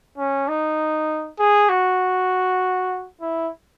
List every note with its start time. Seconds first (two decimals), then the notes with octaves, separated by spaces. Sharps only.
0.18 C#4
0.48 D#4
1.39 G#4
1.69 F#4
3.22 E4